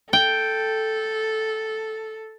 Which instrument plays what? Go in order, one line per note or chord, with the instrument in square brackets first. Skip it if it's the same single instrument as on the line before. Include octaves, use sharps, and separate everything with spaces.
[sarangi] A4 [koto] G5